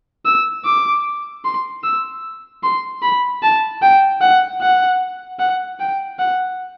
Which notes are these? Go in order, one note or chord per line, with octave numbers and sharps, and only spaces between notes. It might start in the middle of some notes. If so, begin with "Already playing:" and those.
E6
D6
C6
E6
C6
B5
A5
G5
F#5
F#5
F#5
G5
F#5